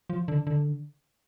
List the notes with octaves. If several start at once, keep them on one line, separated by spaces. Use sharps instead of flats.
F3
D3
D3